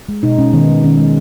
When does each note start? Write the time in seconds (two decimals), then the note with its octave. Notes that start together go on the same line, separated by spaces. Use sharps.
0.09 G#3
0.23 B2 D#4
0.38 G#3 C#4
0.53 D#3 B3
0.69 G#3
0.84 D#3 C#4
0.98 G#3